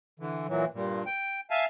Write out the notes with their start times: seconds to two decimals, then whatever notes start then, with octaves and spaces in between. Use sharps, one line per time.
0.20 D3 E3
0.48 A#2 E3 F#3
0.74 G2 A#2
1.06 G5
1.51 E5 F5 G#5 A5